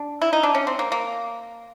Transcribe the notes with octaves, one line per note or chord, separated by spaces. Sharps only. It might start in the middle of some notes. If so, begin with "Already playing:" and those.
Already playing: D4
E4
D#4
D4
C#4
C4
A#3
A#3